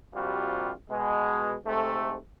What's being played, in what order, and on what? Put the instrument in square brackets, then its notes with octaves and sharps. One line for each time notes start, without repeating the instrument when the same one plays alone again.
[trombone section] A#1 C3 G3 F4 F#4
B2 G#3
G#2 C3 A3